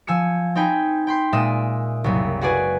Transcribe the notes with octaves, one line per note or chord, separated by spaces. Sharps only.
F3 G#5 E6 C#7
C4 D#4 G5 G#5 B5
G5 B5 C6 G6
A#2 G#3 D5 E5 D#6 E7
F#1 C2
F#4 G#4 B4 D5 G#5